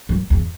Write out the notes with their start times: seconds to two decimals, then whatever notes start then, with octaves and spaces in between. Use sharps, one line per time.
0.09 F#2
0.30 E2